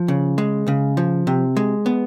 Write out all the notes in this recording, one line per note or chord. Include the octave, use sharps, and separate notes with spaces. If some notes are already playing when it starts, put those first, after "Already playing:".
Already playing: F3
C#3
G#3
C#3
F3
C3
G#3
B3